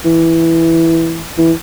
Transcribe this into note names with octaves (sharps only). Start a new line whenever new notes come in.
E3
E3